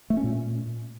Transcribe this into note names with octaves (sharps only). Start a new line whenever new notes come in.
A3
C#4
A#2